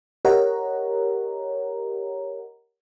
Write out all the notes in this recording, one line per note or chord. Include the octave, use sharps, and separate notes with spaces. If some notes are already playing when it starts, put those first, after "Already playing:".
G4 A#4 C#5 D#5 F#5 A#5